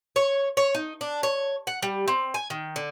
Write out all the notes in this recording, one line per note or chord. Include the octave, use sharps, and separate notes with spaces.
C#5
C#5
D#4
D4
C#5
F#5
G3
C4
G#5
D#3
D3